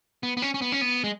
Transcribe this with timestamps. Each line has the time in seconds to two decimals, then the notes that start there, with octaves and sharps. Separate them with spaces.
0.23 B3
0.37 B3
0.42 C#4
0.54 C#4
0.62 B3
0.72 C#4
0.81 B3
1.04 G#3